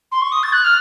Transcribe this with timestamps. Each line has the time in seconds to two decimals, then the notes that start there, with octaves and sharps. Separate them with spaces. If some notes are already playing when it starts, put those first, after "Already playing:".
0.12 C6
0.21 C#6
0.32 D#6
0.43 A6
0.53 F#6
0.64 F6